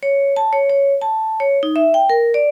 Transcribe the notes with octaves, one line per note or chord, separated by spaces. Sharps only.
C#5
A5
C#5
C#5
A5
C#5
D#4
E5
G5
A#4
D5